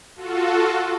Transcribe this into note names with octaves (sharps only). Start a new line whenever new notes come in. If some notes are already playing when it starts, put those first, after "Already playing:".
F4 F#4 A4